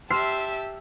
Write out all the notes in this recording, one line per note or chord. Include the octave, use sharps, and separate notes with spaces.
G4 E5 A5 C6 E6 F6 C7